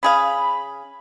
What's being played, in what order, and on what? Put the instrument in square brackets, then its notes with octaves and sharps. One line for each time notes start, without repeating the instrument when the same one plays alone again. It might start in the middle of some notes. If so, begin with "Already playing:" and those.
[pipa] C#3 G#4 F5 [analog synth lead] B5